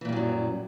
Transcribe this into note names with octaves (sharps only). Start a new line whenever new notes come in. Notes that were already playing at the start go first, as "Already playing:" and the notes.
F#2 A#2 E3 F#3 G3